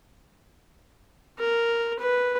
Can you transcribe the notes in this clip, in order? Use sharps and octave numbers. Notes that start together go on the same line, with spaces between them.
A#4
B4